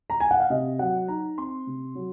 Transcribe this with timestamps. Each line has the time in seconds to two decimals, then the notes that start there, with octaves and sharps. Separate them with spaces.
0.10 A#5
0.20 G#5
0.31 F#5
0.40 F5
0.50 C3 D#5
0.79 F#3 F#5
1.08 D#4 A#5
1.37 C4 C6
1.67 C3
1.95 F#3